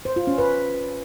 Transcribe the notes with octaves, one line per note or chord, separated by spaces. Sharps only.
C5
F4
C#4
B4